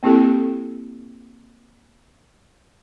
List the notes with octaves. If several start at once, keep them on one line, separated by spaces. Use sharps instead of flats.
A#3 C4 E4 G4 A4